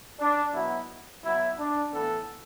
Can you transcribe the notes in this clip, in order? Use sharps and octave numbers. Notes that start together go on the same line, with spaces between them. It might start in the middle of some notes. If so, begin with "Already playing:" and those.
D4
B2 F#3 B3 E4
B2 F#3 B3 E4
D4
A2 E3 B3 A4